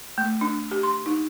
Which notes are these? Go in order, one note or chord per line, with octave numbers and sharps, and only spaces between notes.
A3
D4
G4
C6
D#4